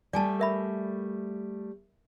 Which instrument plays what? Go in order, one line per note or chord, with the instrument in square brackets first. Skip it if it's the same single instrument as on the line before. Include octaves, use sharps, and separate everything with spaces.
[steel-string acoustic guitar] G3 A3 [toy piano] D5 G#5 A5
[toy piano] A#4 E5 B5